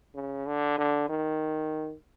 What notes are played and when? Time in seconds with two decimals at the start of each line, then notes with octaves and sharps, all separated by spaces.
0.15 C#3
0.47 D3
0.78 D3
1.09 D#3